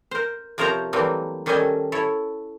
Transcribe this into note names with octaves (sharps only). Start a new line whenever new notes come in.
A#4 C5
C3 F3 A#4 C5 C#5 A#5
E3 F#3 G3 A3 A#3 C4
D#3 G3 C#4 A4 D#5 G#5
E4 A4 C#5